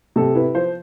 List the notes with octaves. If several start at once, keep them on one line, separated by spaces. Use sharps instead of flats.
C3 A4
E4 B4
F3 C5